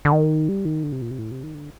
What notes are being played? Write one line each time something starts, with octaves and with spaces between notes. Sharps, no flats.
D3
D#3
G3
D#3
D3
C3
A#2
C3
A2
C3
D#3
D3